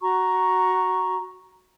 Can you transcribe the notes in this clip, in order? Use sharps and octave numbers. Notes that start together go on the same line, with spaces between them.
F#4 A#5 C#6